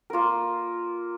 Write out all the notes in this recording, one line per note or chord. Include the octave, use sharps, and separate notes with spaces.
A#3 F4 A#4